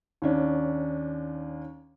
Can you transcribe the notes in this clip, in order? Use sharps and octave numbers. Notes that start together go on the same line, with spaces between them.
D#2 C#4 D4